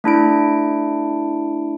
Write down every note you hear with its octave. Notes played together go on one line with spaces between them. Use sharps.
A3 D4 E4 D7